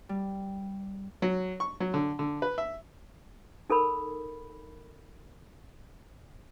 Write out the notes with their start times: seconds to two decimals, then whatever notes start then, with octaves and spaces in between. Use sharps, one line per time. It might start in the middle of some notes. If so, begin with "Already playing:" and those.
0.09 G3
1.22 F#3
1.60 C#6
1.80 F#3
1.94 D3
2.19 D3
2.42 B4
2.58 E5
3.70 D#4 A4 A#4 B5